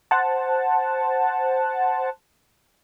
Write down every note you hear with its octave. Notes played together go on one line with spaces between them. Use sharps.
C5 F#5 A5